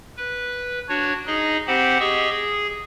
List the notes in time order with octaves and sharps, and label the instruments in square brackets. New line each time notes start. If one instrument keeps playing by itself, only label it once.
[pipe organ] B4
D4 F#4 C#5
D#4 G#4 D#5
C4 G4 C5 F#5 B5
G4 G#4 D#5 C#6 E6
G#4